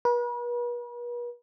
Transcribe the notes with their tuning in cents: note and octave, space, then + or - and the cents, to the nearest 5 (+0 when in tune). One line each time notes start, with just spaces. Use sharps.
B4 -45